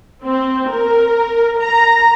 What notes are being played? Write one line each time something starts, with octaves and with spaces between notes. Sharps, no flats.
C4
A#4
A#5